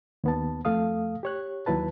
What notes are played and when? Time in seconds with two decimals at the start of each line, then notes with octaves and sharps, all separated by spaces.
0.24 D#2 B3 A5
0.65 F2 A3 A4 F5 D#6
1.23 G4 C#5 F#6
1.66 D#2 F#3 E4 B4 A5